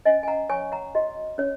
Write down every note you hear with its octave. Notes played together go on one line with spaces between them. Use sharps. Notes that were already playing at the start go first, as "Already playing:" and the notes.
C#4 D#5 G#5
G#5
F#5 A#5
C#5 G#5 C#6
F#5 A#5
F#4 D#5
C#4 C#5